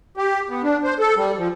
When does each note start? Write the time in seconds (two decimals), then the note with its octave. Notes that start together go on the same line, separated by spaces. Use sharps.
0.17 G4
0.50 B3
0.63 D4
0.83 C5
0.99 A4
1.17 G3
1.38 F3